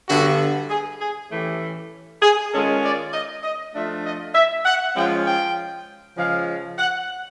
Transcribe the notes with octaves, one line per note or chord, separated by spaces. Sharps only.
G2 D3 G3 B3 F#4
G#4
G#4
A2 E3 A3 C#4 G4
G#4
D#3 G#3 C#4 F4 A4
D5
D#5
D#5
F3 A3 D4 F4 E5
D#5
E5
F#5
F3 G#3 C#4 F4 G5
G5
C#3 F3 G#3 F5
F#5